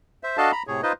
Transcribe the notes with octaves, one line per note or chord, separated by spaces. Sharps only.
C5 E5
D4 F#4 A4 D#5 F5 A5
A#5 B5
A2 C3 G#4 C#5
D#4 F4 B4 C5 D#5